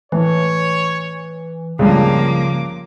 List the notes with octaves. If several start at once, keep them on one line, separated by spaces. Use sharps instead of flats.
A2 E3 C#5
C#2 G2 C#3 F3 A#3 D6